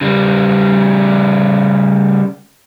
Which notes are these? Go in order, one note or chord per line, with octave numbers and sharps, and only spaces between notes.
C#3 G3